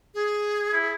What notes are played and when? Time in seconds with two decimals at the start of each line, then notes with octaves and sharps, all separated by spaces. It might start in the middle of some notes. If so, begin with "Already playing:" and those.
0.14 G#4
0.73 E4